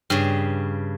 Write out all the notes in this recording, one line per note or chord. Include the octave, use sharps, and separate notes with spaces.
G2 C#3